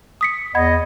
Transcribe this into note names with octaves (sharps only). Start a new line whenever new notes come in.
D#6 B6 C#7
E2 D#5 F#5 B5 G#6